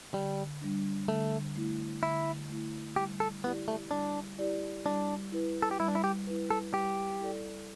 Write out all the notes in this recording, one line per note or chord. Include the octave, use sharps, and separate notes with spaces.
D3 G3
G3 D4
D3 A3
A3 E4
D3 E4
A3 E4
G3 G4
A4
B3 E4 G4 D5
A3
G3 D4
E4 G4 D5
G3 D4
E4 B4
A4
G4
G3 E4
D4
E4
G4
E4 B4
A4
G3 G4
E4 A4 D5